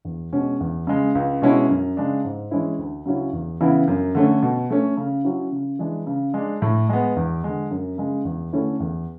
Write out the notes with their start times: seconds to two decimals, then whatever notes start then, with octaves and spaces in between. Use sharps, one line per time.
0.05 E2
0.33 B2 G#3 C#4
0.60 E2
0.87 C#3 G#3
1.15 C#2
1.42 B2 G#3 C#4 E4
1.69 F#2
1.97 C#3 G#3 D4
2.24 G#2
2.51 E3 G#3 C#4 E4
2.79 D2
3.06 C#3 F#3 C#4 E4
3.33 E2
3.60 C#3 E3 B3 E4
3.88 F#2
4.15 D3 A3 C#4
4.42 B2
4.70 A3 C#4
4.97 C#3
5.24 F#3 C#4 E4
5.52 C#3
5.79 E3 G#3 D4
6.07 C#3
6.34 G#3 D4
6.62 A2
6.89 G#3 B3
7.16 E2
7.44 D3 G#3
7.71 F#2
7.98 C#3 G#3
8.25 E2
8.53 D3 A3 C#4 E4
8.80 E2